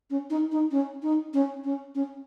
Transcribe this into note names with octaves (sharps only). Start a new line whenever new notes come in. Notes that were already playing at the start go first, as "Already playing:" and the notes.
C#4
D#4
D#4
C#4
D#4
C#4
C#4
C#4